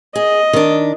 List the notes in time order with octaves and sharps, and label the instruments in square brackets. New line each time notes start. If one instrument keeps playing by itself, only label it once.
[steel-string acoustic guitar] G#4 [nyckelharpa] D#5
[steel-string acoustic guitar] D#3 D4